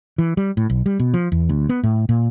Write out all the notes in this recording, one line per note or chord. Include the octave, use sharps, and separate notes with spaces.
E3
G3
A2
B1
G3
B2
F3
E2
D2
B3
A2
A#2